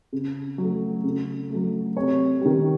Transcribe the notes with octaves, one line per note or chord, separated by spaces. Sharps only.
C#3
F#3 A3
C#3
F#3 A3
C3 C#5
D#3 G3